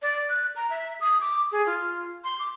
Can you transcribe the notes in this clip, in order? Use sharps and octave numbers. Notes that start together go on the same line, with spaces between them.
D5
F#6
A#5
E5
D#6
D6
G#4
F4
C6
D6